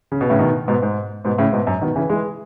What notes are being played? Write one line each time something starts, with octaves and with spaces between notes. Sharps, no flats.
C#3
B2
A2 C#3
B2 D#3
G#2 B2
G#2
G#2 B2
A2 C#3
G#2 B2
F#2
B2 D#3
C#3 E3
E3 G#3